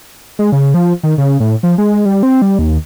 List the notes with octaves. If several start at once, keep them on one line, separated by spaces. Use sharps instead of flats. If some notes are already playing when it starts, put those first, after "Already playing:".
G#3
C#3
F3
D#3
C#3
A2
F3
G#3
G3
C4
G3
D#2